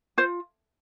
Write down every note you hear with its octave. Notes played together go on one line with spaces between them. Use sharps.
F4 C5